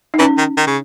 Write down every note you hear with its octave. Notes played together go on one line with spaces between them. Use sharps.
D#4
E3 C#4
D#3
D#3
C#3